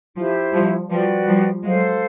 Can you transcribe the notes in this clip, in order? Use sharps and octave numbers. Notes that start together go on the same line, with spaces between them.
F3 E4 G4 C5 E5
F3 G3
F3 G3 F#4 B4 D5 G5
F3 G3
F#3 G#3 A4 C5 F5